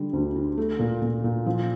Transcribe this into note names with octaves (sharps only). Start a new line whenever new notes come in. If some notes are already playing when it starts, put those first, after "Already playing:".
Already playing: D3 G3
D2
D3
A3
A#2
A#2
A#2
F3